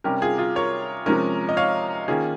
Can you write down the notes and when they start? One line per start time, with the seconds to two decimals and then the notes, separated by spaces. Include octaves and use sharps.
0.04 C3 G3 C#4 G4 A#4
0.22 F4 G#4
0.38 F4 G#4
0.56 A#4 C#5
1.06 C3 F3 G#3 C#4 A#4 C#5
1.49 D#5
1.57 C#5 F5
2.08 D#3 A#3 C#4 F4 G#4